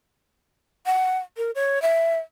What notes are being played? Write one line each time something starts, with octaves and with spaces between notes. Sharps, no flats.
F#5
A#4
C#5
E5